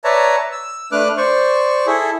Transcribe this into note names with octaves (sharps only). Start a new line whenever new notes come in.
B4 C#5 D5 E5 A5 A#5
E6
A3 D4 B4 D6 F6 F#6
C5 D5 C#6
E4 G#4 A4 E5